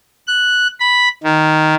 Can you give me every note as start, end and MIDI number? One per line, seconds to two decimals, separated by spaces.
0.27 0.67 90
0.80 1.08 83
1.24 1.75 51